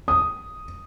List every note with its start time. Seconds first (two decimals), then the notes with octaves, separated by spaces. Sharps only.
0.08 D#6